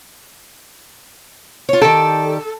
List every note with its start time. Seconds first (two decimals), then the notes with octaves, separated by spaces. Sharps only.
1.69 F4 C#5
1.82 D#3 G4 A4 D5